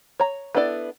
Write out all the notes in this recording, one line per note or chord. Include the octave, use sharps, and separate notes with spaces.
C#5 A#5
B3 D4 E4 A4 D5